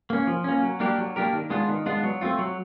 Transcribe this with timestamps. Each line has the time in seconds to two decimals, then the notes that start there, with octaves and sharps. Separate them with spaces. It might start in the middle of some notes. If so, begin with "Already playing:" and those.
0.10 A#3 C#4
0.27 F3
0.44 A#3 C#4
0.63 F#3
0.80 A#3 D4 G4 A#4
0.98 F#3
1.16 A#3 D4 G4 A#4
1.33 D#3
1.50 G#3 B3 D4 F4
1.69 D#3
1.86 G#3 B3 D4 F4
2.03 F#3
2.21 A3 C4 F4
2.39 F#3